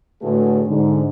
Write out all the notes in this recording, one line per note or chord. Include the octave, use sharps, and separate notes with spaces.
A2 D3 A3 F#4 G#4 B4
G#2 D3